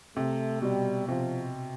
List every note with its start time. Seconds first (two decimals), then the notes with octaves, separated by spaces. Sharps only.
0.16 C3 A3
0.62 B2 G3
1.08 C3 F3